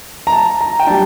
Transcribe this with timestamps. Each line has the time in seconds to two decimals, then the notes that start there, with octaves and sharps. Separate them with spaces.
0.27 A#5
0.32 A5
0.61 A#5
0.79 G5
0.87 G3 D4 A5